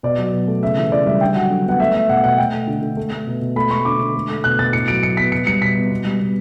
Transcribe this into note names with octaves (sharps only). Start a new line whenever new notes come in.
B2 D5
F#3
B2
A3
C#3 E5
E3
C#3 D5
G3 E5
D3 G5
F#3 F#5
D3
B3 F#5
A3 E5
A3 E5
B2 F#5
B2 F#5
A3 G5
A3
D3
D3
A3
A3
B2
B2
A3 B5
A3 C#6
D3 D6
D3
A3
A3
B2 F#6
B2 A6
A2 C#7
F#3 D7
A2 C#7
B3 B6
B2 C#7
G3 C#7
B2 B6
B3
B2
G3
B2